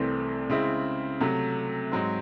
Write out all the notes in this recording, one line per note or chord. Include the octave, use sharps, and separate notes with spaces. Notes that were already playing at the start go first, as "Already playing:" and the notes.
Already playing: C2 C3 E3 A3 C4
C#3 G#3 C4 E4
C3 F#3 A3
G#2 F#3 C4